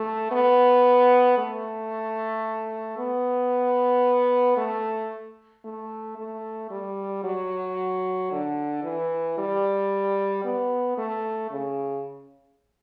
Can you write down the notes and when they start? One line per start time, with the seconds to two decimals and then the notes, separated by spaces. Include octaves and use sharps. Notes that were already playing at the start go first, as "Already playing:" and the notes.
Already playing: A3
0.31 B3
1.38 A3
2.98 B3
4.57 A3
5.65 A3
6.18 A3
6.71 G3
7.24 F#3
8.31 D3
8.84 E3
9.38 G3
10.45 B3
10.98 A3
11.51 C#3